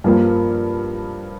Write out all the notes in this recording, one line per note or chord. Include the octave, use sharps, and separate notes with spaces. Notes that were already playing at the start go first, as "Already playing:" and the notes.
G2 F3 A#3